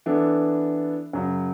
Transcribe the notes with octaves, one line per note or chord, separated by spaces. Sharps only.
E3 B3 D4 A4
F#2 C#3 F#3